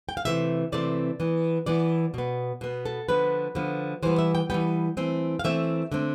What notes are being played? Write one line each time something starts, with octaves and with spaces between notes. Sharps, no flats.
G5
F5
C3 E3 A3 C4 E5
C3 E3 A3 C4 D5
E3 B3
E3 B3 D5
B2 B3
B2 B3
A4
D3 F3 B3 B4
D3 F3 B3
E3 G3 B3 C5
E5
G5
E3 G3 B3 G5
E3 A3 C4
F5
E3 A3 C4 E5
D3 A3 C4